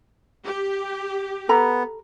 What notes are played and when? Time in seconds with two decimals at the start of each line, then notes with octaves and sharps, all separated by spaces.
0.45 G4
1.49 B3 A4 A#5 B5